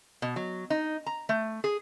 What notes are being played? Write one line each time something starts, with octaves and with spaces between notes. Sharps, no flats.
B2
F#3
D#4
A#5
A3
G#4